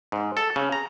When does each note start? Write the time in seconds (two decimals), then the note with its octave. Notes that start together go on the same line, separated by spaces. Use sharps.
0.12 G#2
0.37 A4
0.56 C#3
0.72 A#5